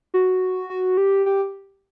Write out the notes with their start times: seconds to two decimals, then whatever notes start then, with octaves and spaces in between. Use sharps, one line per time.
0.14 F#4
0.70 F#4
0.97 G4
1.26 G4